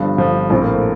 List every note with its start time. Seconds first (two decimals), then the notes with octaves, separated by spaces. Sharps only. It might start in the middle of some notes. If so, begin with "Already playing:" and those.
Already playing: G1 G2 F3 D4
0.17 G1 G2 F3
0.50 A#1 A2 F3 C4
0.62 A#3
0.74 A3